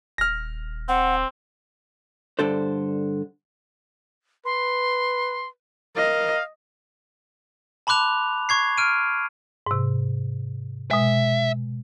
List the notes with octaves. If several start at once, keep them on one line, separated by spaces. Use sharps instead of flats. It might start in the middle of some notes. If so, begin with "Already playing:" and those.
D#1 F6 A#6
C4 F#5
G2 D3 A4 C5
B4 C6
A#4 D#5 F5
A5 B5 C6 D6 F#6 F7
C#6 G#6 C7
F6 D7 D#7
G#2 C3
B2 G#3 E5